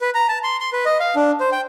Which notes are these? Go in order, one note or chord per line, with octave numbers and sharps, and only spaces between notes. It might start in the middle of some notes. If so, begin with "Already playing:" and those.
B4
A#5
A5
C6
C6
B4
D#5
F5
D4
C5
G5